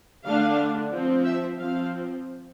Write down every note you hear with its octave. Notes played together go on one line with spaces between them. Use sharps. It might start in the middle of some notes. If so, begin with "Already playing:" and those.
D3 A3 D4 F5
F3 C4
E5
F3 C4 F5